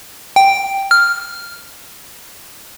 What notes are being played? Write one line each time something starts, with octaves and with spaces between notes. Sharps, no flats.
G5
F6